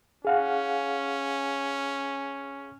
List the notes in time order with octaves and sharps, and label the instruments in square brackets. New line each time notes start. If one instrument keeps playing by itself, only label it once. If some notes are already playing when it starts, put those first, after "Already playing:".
[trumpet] C#4 [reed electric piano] G#4 F5 F#5